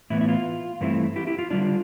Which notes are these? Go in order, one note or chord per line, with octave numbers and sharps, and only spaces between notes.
A2 E3 B3 E4
E4
F4
G2 E3 A3 C4 E4
E4 G4
E4 G4
F4
D3 G3 D4 F4